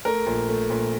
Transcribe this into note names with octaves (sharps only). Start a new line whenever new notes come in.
A3 A#4
A#1
A3
A#1